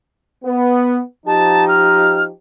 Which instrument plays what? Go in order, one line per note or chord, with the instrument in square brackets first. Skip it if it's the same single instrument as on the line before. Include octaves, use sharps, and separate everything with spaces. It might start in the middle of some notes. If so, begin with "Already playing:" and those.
[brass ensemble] B3
[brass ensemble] F3 D#4 G4 [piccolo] A5
[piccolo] F6